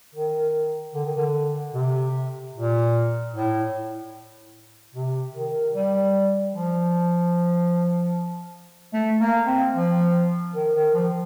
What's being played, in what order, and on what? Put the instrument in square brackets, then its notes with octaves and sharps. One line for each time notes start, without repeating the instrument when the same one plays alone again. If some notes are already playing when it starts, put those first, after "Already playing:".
[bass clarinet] D#3
D3
D#3
D3
C3
A#2
A2
C3
D#3
G3
F3
A3
A#3
C4
F3
D#3
D#3
F3